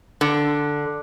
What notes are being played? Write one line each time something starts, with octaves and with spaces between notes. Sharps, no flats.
D3